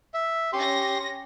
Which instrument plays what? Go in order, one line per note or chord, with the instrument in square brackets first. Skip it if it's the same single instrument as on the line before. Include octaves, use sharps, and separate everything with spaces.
[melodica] E5
[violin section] C#4 A#6 [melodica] G4 C6